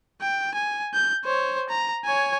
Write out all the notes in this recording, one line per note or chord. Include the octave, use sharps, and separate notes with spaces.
G5
G#5
G6
C5 C#5
A#5
C#5 G#5